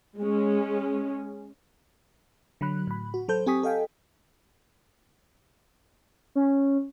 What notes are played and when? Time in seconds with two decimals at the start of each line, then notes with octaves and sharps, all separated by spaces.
0.19 G#3 C#4
2.61 D3 F#3 B5 F#6
2.87 A2 B5
3.14 F#4
3.28 F#3 A4 C5 G6
3.46 C4 G4 G#5 C#6 D#6 B6
3.63 A4 D#5 F5 G5 G#5
6.35 C#4